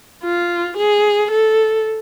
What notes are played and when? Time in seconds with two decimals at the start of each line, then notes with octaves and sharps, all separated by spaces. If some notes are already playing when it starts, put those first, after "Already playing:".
0.23 F4
0.77 G#4
1.31 A4